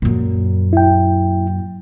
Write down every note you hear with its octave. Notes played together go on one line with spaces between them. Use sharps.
F#2 A#2
E4 G5